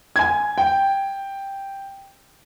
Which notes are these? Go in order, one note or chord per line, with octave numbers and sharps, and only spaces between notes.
G#5 G#6
G5